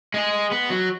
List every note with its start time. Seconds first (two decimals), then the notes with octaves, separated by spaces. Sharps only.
0.14 G#3 G#4
0.52 B3
0.70 F#3